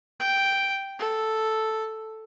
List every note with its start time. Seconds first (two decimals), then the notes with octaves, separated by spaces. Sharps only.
0.20 G5
0.99 A4